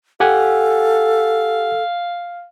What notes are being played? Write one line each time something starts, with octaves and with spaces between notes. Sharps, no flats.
G4 A4 F5 F#5 G#5